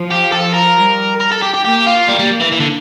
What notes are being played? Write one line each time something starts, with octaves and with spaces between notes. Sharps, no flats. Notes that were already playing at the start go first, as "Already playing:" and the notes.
Already playing: F3
G4
A4
A#4
G3
A#4
A4
G4
G4
A#3 G4
F4
G3 A#3
G3
E3
E3
D3